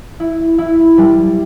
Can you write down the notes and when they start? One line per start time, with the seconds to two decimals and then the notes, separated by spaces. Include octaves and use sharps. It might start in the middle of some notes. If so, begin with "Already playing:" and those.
0.20 E4
0.58 E4
0.98 G3